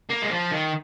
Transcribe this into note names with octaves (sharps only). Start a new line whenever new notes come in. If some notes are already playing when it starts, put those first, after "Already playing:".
A#3
G#3
F3
D#3